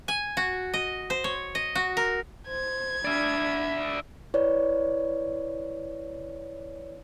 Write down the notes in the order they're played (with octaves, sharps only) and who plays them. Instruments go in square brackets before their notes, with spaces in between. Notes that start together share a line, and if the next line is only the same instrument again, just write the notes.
[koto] G#5
F#4
D#5
C5
C#5
D#5
F#4
A#4
[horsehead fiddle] C5 [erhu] G#6
[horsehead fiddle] D4 B5 [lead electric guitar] D5 E5
[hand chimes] E4 B4 C#5 D5